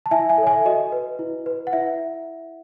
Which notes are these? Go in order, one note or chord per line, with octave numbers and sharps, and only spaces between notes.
A5
E4 E5 G#5
E5 G#5
A4
C#5 E5 G#5
F#4 D#5
B4
E4
B4
F#5
E4 E5